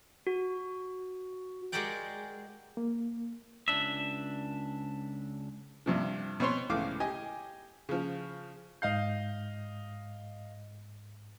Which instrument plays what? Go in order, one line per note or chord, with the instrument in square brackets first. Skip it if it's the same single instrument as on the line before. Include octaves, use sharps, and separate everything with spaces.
[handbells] F#4
[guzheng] G#3 F#4 G4 A#4 D5 G5
[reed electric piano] A#3
[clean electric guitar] C#2 B2 D4 E5
[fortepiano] G2 C3 F3
B2 C4 C#5 C6
C#2 A2 E3 F5 D6
G4 D#5 G#5
C#3 F3
[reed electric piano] G#2 G6 [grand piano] D#5 F5 C7